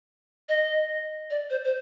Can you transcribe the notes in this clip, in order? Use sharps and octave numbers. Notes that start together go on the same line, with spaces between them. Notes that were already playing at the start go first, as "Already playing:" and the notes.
D#5
D5
C5
C5